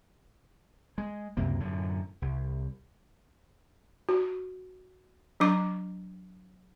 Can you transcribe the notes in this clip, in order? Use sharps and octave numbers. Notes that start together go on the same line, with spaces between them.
G#3
C#2 F#2 C3 A#3
F#2 A2 D3
C2
F#4
F#3 D4 D6